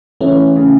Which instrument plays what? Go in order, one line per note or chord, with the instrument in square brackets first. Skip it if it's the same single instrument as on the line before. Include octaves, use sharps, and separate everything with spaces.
[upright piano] E3 [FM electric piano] A3 C#4
[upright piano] C#3